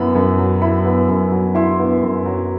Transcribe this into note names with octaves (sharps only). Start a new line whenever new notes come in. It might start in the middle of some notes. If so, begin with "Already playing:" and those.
Already playing: F#2 B3 E4 B5
F#2
F#3
E4 B5
B3
F#2
F#3
E4 C6
B3
F#2
F#3